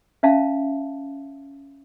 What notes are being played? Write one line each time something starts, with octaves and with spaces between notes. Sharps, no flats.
C#4 E5 F5 A5